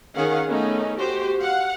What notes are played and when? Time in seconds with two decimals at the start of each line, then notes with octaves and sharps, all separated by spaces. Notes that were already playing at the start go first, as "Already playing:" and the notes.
0.14 D#3 C#4 G#4 F5 F#5
0.47 A3 B3 C#4 D#4
0.97 F#4 G4 C5
1.41 F5 F#5